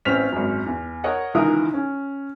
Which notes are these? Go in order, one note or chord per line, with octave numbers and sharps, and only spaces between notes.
A1 C4 C#4 F6 B6 F7
G#1 F#2
E2
A#4 C#5 D#5 F#5
C#2 D#3 E3 E4 A#4 D#6
C#4